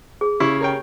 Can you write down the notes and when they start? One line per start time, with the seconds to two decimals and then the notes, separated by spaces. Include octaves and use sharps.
0.21 G#4
0.40 C#3 E4 G4
0.61 A#4 C#5 G5